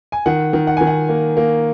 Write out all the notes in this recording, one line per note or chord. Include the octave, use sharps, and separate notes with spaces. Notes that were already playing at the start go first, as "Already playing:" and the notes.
G#5
D#3 F#5
D#3
F#5
D#3 G#5
F#5
A#3
A#3